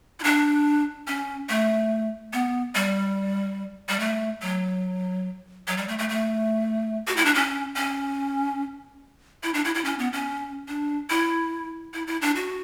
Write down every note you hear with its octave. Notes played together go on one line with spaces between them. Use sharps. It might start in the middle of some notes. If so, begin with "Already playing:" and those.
E4
D4
C#4
A3
B3
G3
G3
A3
F#3
F#3
G3
A3
A3
A3
F#4
E4
D4
C#4
C#4
E4
D4
E4
E4
C#4
B3
C#4
D4
E4
E4
E4
D4
F#4